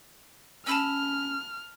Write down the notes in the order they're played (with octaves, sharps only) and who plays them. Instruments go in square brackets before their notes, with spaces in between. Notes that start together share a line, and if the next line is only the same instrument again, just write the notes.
[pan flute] C#4 [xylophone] A5 B5 E6 [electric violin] F6